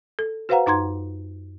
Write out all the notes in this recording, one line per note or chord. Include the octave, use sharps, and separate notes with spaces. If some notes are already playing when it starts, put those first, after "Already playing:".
A4
F#4 B4 C5 F5 F#5 A#5
F#2 D#4 A#5 C6 G#6